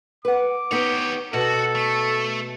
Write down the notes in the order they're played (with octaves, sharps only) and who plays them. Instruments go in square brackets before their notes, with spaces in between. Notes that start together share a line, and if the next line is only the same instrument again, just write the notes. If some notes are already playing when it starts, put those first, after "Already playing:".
[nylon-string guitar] B4 F#5 [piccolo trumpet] D6
[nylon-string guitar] B3 D#4 [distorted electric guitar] G4 C#5
[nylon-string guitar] B2 [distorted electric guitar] F#4 [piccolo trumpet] A4
[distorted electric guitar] A3